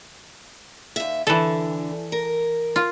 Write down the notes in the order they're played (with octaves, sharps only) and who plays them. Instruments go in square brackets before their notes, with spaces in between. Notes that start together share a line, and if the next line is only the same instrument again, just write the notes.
[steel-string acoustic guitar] D#2 E5
[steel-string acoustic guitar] D3 [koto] E3 A4
[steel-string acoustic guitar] A#4
[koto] F4